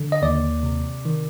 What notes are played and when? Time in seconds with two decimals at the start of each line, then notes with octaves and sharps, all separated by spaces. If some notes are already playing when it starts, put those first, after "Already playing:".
Already playing: D3
0.12 D#5
0.22 D#2 D5
0.63 C3
1.05 D#3